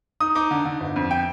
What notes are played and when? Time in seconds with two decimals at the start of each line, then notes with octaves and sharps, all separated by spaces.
0.20 D#4 D#6
0.35 D#4 D6
0.51 D3
0.65 D3
0.80 G1
0.96 F2
1.11 G5